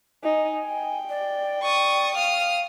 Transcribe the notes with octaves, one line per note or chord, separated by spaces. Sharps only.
D#4 G#5
G5
D5
D5 C#6 D#6
F5 D#6 F6